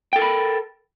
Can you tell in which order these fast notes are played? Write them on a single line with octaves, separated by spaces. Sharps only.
G5 A4 A#4 B5